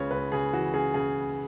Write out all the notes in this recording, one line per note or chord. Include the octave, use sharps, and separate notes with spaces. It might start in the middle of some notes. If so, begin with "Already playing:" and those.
Already playing: C#2 C#3 B4 C#5
C#2 B4
C#3 G#4
E3 F#4
C#3 G#4
C#3 G#4